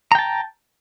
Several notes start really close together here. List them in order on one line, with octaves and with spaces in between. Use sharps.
A#5 G5 A5